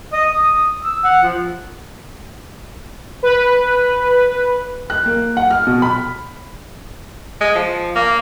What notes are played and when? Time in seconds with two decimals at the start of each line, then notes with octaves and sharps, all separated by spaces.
0.12 D#5
0.31 D#6
0.82 E6
1.04 F#5
1.23 F3
3.23 B4
4.90 F#6
5.06 A#3
5.37 F#5
5.50 F6
5.67 B2
5.82 B5
7.41 G#3
7.55 F3
7.95 A#3